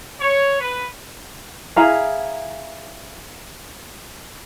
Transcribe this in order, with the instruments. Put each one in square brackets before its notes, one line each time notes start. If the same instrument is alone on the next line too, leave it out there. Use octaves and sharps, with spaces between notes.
[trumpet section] C#5
B4
[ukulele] E4 G#4 F5 A#5